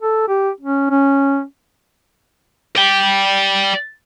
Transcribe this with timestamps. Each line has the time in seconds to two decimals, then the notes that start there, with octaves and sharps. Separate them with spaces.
0.02 A4
0.28 G4
0.61 C#4
0.90 C#4
2.76 D5 G5